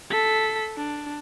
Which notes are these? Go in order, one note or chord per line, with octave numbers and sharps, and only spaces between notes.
A4 B6
D4